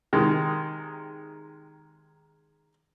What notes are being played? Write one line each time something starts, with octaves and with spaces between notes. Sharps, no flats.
C3 D#3 G#3